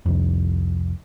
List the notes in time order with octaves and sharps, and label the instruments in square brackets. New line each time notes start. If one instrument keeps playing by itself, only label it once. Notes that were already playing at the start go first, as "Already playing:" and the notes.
[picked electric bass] C2 F2